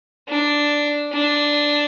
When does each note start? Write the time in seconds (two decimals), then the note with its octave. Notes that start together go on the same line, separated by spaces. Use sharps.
0.29 D4
1.13 D4